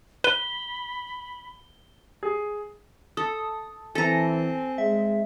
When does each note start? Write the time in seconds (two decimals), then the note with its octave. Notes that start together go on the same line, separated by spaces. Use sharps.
0.24 B4 B5 G7
2.23 G#4
3.17 A4 D#6
3.95 E3 C4 A4 G#5 A#5
4.78 G#3 E5